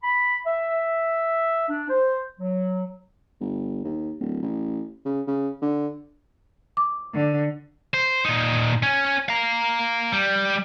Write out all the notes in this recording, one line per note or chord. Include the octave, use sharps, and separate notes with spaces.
B5
E5
D4
C5
F#3
G1
D#2
D1
A1
C#3
C#3
D3
D6
D3
C5
A#2 D#4
C#4
F5 A#5
G3